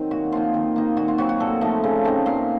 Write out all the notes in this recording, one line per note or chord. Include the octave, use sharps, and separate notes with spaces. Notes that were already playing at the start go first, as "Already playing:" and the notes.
Already playing: D#3 F#3 C4 D#4
A#2 F#4
F3 A#3 D#4 F4
D#3
A#3 D#4
A#2 F#4
F4
F#3 C4 F#4
F#4
A#2 A4
F3 A3 D#4
C#3
A3 C4 D#4
A#2 F5